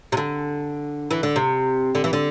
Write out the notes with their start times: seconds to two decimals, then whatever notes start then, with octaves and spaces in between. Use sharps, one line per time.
0.12 C3
0.17 D3
1.11 E3
1.23 D3
1.36 C3
1.95 D3
2.04 E3
2.13 D3